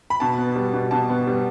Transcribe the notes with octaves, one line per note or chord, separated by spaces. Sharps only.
B5
B2 A5
B3
G3
B2
B2 A5
B3
G3